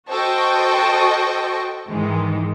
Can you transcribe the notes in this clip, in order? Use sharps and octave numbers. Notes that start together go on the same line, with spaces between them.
F#4 A4 C5 D#5 G5 C#6
G#2 D#3 E3 G#3